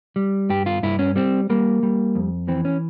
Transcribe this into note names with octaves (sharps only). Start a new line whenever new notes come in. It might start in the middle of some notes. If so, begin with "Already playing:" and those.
G3
G2 G4
F4
G2 E4
C#4
G3 C4
G3 A#3
G3
F2
E3 C4
C#4